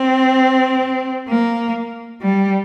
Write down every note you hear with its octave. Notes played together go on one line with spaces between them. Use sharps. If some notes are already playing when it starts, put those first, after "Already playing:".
Already playing: C4
A#3
G3